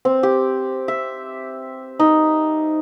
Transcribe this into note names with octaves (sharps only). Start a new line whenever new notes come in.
C4
G4
E5
D#4